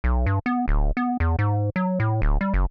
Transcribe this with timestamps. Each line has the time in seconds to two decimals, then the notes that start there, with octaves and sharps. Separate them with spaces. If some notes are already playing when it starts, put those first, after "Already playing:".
0.04 B1
0.26 G2
0.46 B3
0.68 D1
0.97 B3
1.20 E2
1.39 G#2
1.76 F#3
2.00 A2
2.22 D1
2.41 G3
2.54 F#1